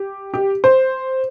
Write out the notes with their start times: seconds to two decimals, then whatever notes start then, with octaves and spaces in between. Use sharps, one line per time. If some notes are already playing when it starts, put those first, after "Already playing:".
Already playing: G4
0.34 G4
0.64 C5